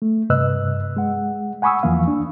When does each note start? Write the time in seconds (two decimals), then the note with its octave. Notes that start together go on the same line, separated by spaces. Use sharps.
0.02 A3
0.30 G2 C3 B4 D#5 E6 F#6
0.97 G#3 F#5
1.62 F#5 G#5 B5 C#6 D#6 E6
1.83 E2 E3 F3 A#3 F5
2.08 D4